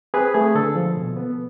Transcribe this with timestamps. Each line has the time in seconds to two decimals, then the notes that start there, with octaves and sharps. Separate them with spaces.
0.14 C4 G#4 B4
0.34 A3 G#4
0.55 D3 A4
0.75 F3
0.96 B2
1.17 B3